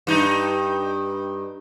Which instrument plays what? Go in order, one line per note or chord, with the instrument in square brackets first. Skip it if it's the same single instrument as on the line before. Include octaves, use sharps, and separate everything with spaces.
[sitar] G2 D#4